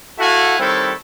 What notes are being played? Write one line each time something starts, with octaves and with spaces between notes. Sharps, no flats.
E4 F#4 A4 F5 F#5 G#5
D#3 G3 C4 E4 A4 C#5